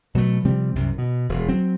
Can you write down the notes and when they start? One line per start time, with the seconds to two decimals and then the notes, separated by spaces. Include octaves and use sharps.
0.15 B2 F#3 A3
0.45 C3 F3 G3 C4
0.76 C2 F#2 C3
0.98 B2
1.29 E1
1.49 F#3 C4